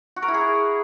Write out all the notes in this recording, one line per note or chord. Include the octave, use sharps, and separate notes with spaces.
F#4
A#4
E4
G#4